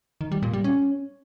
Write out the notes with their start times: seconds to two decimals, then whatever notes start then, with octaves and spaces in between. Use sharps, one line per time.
0.21 D#3
0.32 G3
0.42 A#2
0.53 G3
0.64 C#4